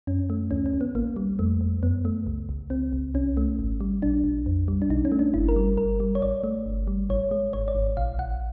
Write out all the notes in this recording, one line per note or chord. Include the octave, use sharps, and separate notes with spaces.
F#2 C#4
A3
D2 C#4
C#4
D2
B3
A1 A#3
G3
F2 A3
F2
F#2 B3
A3
C#2
C#2
C#2 C4
C#2
C2 C#4
A3
G#1
G3
A#1 D4
A#1
F2
G3
D4
B1 D#4
C#4
A3
D4
G1 E4
A#4
G3
G1 A#4
G3
C#5
A1 D5
A3
G1
G3
A1 C#5
G#3
G#1 C#5
D5
G#1
A#1 F5
A#1 F#5